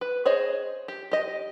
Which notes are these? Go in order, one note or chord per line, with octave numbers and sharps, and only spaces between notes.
B4
G#4 C5 C#5 D#5
G4
G4 D#5